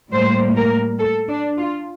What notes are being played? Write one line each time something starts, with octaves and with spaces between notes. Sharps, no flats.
A2 G3 A#3 C5
A#4
A4
D4
F4